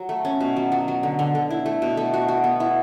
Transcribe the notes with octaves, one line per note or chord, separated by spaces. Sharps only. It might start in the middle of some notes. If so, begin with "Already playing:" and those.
Already playing: F#3
A3
C#4
B2
F#3
F#3
F#3
D3
D3
D3
E4
A3
B2
A3
F#4
F#4
B3
E4